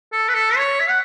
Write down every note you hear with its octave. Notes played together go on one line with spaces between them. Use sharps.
A4
B4
A4
C#5
E5
F#5